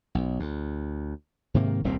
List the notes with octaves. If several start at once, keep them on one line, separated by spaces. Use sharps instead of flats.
B1
D2
G#2 C3 D#3 A#3
D#1 C2 A#2 C4